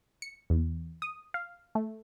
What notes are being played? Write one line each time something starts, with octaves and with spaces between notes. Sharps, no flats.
C#7
E2
D#6
F5
A3